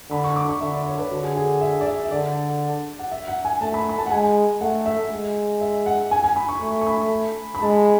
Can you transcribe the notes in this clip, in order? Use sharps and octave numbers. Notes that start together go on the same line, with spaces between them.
D3 B5
C#6
D6
C#6
D3 E5
D5
C#5
B4
D3 F#4
G#4
G#4
E5
D5
E5
E5
D3 D5
F#5
E5
F#5
G#5
A3 A5
B5
B5
A5
F#5
G#3 G#5
A3 F#5
E5
G#3
E5
F#5
G#5
G#5
B5
C#6
A3 C#6
C#6
B5
B5
G#3 A5